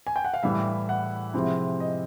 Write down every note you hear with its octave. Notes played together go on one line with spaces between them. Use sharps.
G#5
G5
F#5
F5
A2 E3 G3 E5
F#5
C3 F3 G#3 C4 E4
D#5